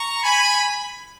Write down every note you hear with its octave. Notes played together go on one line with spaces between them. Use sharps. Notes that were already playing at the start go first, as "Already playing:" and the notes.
Already playing: A#5 C#6
G#5 B5